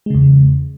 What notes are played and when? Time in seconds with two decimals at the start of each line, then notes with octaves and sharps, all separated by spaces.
0.06 G#3
0.10 C#3
0.15 E2